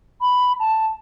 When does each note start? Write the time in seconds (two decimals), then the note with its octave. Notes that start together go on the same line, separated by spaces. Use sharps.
0.21 B5
0.60 A5